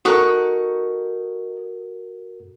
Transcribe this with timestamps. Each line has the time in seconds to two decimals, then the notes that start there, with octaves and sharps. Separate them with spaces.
0.05 D#4 F#4 A4 A#4 C#6 F#6